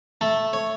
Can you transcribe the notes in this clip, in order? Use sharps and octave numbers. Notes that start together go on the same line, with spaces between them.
A3 A4
C#5